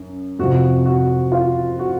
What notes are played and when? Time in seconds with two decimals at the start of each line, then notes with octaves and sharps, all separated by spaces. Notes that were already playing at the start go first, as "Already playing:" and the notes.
Already playing: F#2
0.39 F2 C3 F3 F#4
0.86 F#4
1.32 F4
1.79 F#4